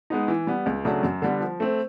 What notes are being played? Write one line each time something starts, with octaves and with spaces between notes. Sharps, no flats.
G#3 B3 D#4
E3
G3 B3
C#2
C#3 F#3 A3 D4
F#2
D3 G3 B3
F3
A3 C4